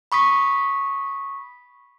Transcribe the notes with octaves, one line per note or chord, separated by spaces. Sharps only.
B5 C#6 D#6 B6